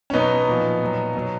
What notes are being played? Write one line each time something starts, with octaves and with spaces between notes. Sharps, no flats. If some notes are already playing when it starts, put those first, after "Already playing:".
C#4
B2 F#3 B3 D#4
A#2 F3
A#2 F#3
B2 F#3